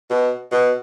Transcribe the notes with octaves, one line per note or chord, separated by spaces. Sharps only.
B2
B2